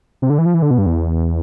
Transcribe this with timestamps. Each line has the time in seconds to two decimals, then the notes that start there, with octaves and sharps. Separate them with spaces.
0.22 C3
0.30 D3
0.38 E3
0.46 F3
0.54 E3
0.62 D3
0.71 B2
0.78 G2
0.86 E2